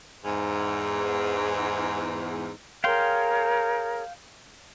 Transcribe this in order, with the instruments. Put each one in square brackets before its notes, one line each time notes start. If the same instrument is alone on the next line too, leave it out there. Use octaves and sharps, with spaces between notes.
[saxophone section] E2 G#2
[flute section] G#4 A#4 C#5 [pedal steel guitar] F5 G5 C6